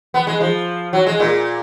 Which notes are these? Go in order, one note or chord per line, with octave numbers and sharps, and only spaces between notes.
B3
G#3
F3
F#3
G#3
A#2